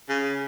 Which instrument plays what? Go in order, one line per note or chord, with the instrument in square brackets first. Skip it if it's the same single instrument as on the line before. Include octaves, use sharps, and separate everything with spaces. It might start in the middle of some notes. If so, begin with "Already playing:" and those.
[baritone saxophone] C#3